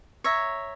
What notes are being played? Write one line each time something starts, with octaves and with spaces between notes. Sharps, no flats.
C#5 E5 A#5